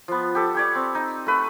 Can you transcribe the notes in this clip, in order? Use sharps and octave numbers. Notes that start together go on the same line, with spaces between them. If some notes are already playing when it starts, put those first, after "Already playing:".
F3 B3
G4 A4
G4 C#5 D5
C4
D#4
A3 B4